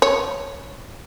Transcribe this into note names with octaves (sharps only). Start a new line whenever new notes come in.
C#5